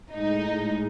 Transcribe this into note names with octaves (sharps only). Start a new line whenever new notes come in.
A2 G#3 D#4